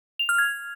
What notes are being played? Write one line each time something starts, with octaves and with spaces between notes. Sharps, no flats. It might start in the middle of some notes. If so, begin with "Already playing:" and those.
F7
F6
G#6